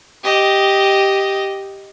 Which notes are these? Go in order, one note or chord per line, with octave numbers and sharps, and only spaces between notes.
G4 D#5